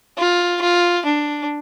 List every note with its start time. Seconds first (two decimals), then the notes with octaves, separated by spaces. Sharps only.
0.18 F4
0.61 F4
1.05 D4